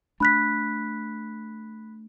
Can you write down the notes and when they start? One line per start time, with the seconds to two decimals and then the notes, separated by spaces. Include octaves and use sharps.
0.20 A3 D4 B5 F#6 B6